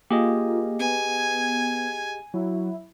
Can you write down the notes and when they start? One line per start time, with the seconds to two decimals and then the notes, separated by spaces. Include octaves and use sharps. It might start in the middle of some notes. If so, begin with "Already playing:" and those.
0.10 A#3 F4 G4 G#4 D#5
0.79 B3 G#5
1.16 G#6
2.34 F#3 E4